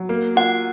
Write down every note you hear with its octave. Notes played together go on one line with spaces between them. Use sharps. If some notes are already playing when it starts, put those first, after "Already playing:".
Already playing: F#3
A#3
F4 F#5